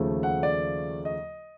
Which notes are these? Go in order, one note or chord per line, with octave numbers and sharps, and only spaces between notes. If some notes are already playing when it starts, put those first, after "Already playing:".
Already playing: D#2 C#3 F3 A3
F#5
D5
D#5